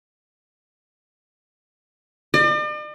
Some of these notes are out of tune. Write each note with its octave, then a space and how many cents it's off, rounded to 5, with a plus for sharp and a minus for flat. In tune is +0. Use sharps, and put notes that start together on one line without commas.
D5 +45